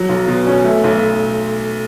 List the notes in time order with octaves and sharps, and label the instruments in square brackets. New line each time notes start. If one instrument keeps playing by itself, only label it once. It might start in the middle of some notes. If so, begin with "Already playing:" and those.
Already playing: [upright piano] F#3
B1
B2
C#4
A3
B1